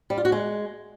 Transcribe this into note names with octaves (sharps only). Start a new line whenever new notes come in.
G3
F4
F#4
G#3